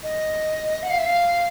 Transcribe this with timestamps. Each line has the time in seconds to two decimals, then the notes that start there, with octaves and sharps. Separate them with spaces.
0.03 D#5
0.83 F#5
0.90 F5
0.98 E5
1.06 F5